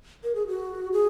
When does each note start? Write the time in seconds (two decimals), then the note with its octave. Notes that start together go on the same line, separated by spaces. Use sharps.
0.24 A#4
0.35 G#4
0.48 F#4
0.92 G#4